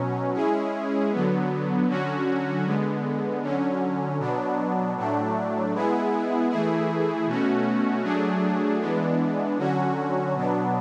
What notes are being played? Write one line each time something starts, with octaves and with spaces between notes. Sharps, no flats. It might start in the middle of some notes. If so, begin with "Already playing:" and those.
Already playing: B2 F#3 C#4
G#3 C#4 E4 G#4
D3 F#3 B3
D3 F#3 C#4 F#4
D3 G#3 B3
D3 F#3 C#4
B2 F#3 B3 D4
A2 F#3 A3 D4
G#3 B3 E4 G#4
E3 A3 E4 G#4
B2 A3 C#4 F#4
F#3 A3 D4 G#4
E3 G#3 B3 D4
D3 F#3 C#4 F#4
B2 F#3 B3 D4